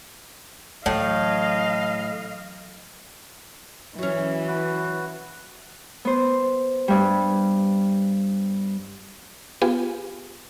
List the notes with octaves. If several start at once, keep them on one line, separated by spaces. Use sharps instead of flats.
A2 E3 F#3 D#5 F5
E3 F#3 C#4
F#4 B4
B3 C5
G2 G3
B3 F4 G4 G#4